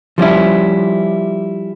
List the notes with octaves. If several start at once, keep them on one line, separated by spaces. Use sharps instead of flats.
F3 G3 C#4 E4